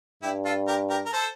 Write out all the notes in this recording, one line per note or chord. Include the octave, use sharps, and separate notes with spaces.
G2 E4 G4
F4 A4
G4 A#4
G4 A#4
A#4
A4 C5